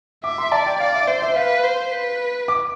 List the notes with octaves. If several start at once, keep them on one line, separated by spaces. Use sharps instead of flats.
E5 D6
C6
D5 A5
G5
D5 F5
E5
C5 E5
E5
B4 F5
C5
B4
D6